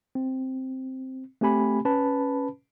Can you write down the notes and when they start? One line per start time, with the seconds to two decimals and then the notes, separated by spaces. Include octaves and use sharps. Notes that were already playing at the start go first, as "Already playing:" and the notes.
0.15 C4
1.41 A3 C4 G4 G#5 B5
1.85 C#4 B4 A5 B5